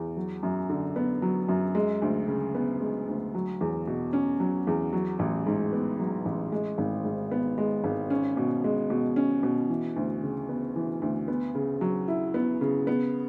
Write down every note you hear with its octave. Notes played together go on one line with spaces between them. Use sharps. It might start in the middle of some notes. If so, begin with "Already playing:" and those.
Already playing: E2
F#3
F#2
D3
B3
F#3
F#2
G#3
D2
C#3
B3
G#3
D2
F#3
E2
B2
C#4
F#3
E2
F#3
A1
G#2
B3
F#3
A1
G#3
G#1
G#2
B3
G#3
G#1
C#4
B2
G#3
B2
C#4
B2
E3
D2
C#3
B3
E3
D2
B3
C#3
F#3
E4
B3
C#3
B3